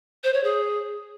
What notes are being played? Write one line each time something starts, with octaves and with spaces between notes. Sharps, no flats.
C5
C#5
G#4